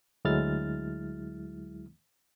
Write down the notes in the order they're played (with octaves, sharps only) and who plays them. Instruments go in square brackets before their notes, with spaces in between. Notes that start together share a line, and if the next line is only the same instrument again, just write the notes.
[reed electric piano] D2 F#3 G#3 E4 F6 A6